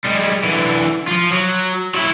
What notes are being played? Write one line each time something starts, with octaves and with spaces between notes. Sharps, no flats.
G3 G#3
D3 E3
F3 F4
F#3
F#3 E4